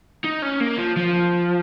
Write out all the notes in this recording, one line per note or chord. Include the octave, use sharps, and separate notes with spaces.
D#4
C#4
A#3
F3
F3